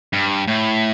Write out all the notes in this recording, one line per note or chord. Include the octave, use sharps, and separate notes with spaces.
G2
A2